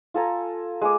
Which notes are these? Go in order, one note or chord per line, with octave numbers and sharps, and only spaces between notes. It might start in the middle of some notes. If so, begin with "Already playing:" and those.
F4 A4 G#5 A#5
G#3 G#5 D6